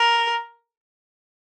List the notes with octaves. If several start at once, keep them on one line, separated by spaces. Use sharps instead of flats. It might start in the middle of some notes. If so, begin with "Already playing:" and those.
Already playing: A#4